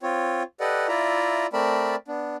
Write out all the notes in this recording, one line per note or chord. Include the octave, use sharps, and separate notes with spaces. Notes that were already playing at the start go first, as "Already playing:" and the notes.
C4 F4 C#5
G4 A4 B4 D5 D#5 F#5
E4 F4 D5 E5 A#5
A3 C4 A#4 D5 A5 B5
B3 D4